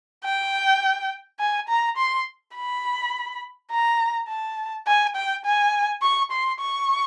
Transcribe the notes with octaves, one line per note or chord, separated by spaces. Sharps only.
G5
G#5
A#5
C6
B5
A#5
A5
G#5
G5
G#5
C#6
C6
C#6